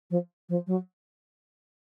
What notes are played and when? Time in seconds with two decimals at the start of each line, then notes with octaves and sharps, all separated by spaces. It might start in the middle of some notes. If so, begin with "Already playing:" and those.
0.10 F3
0.49 F3
0.67 F#3